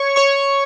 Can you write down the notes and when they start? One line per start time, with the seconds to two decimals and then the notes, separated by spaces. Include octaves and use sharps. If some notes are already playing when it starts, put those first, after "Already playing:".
Already playing: C#5 C#6
0.16 C#5 C#6